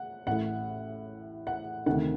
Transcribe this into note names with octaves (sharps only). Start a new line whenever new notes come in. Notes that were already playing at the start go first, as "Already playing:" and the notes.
Already playing: F#5
A1 A2 F#5
F#5
D2 C3 D#3 F#5